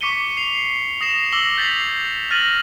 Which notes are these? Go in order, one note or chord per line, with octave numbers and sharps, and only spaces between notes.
C#6 D6 B6 C#7 D#7 G7
C7 F7
D#6 A#6 C7 E7 F7
D6 E6 A#6 F#7 G7
G6 A6 B6 C7 F7
F6 A6 A#6 D#7 F#7